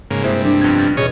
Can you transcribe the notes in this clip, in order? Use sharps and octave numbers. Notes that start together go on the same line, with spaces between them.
G#2 C#3 A#3
G2 C3 G#3 A#3 E4 C5
G3 D4
F2 B3 G#6
F6 G6 A6
E2 B2 C#4 G#4 C#5 D#5